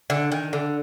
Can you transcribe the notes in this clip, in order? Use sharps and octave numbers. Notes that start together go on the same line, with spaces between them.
D3
D#3
D3